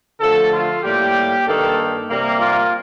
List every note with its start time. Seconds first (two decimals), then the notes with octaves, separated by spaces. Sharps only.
0.20 D3 F3 A3 A4
0.52 F4
0.83 A2 G3 A#3 G4
1.47 G2 D#3 A#3 A4
2.10 C3 G3 A#3
2.41 F4